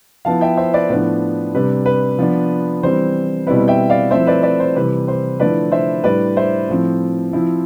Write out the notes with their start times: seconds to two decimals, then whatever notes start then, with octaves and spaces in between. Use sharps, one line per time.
0.25 F3 B3 E4 F5 A5
0.41 E5 G5
0.57 C5 E5
0.74 B4 D5
0.90 A2 F3 B3 D4 B4
1.55 C3 G3 D4 B4
1.86 B4
2.18 F3 B3 D4
2.83 E3 G3 C4 C5
3.47 B2 G3 C4 E4 B4
3.68 E5 G5
3.90 D5 F5
4.11 F3 A3 C4 E4 C5 E5
4.27 B4 D5
4.43 B4 D5
4.60 C5
4.75 C3 E3 G3 B4
5.08 C5
5.40 D3 F3 A3 E4 B4 D5
5.72 C5 E5
6.04 A2 G3 D4 B4 D5
6.37 C5 E5
6.69 A2 F3 C4
7.33 F3 C4 E4